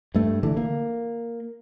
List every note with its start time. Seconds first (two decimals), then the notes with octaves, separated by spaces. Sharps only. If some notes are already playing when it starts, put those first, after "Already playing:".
0.15 G2 A3
0.43 D3 E3
0.57 A#3